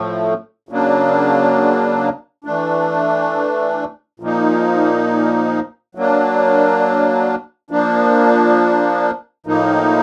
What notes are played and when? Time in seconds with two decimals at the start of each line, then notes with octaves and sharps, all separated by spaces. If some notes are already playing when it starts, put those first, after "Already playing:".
Already playing: A2 F3 A3
0.69 C#3 F#3 A#3 D4
2.44 E3 A3 D4
4.20 A#2 F3 A#3 D#4
5.95 F#3 A#3 D4
7.71 F3 A#3 D4
9.46 A2 F3 A#3 D#4